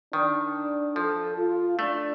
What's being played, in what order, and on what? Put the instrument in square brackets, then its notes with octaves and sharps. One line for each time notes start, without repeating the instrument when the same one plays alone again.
[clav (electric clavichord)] D#3 [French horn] D4
[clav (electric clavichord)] F3 [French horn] A4
[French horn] F4
[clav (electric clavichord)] A3 [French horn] D4